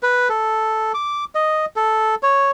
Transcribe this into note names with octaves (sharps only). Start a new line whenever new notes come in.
B4
A4
D6
D#5
A4
C#5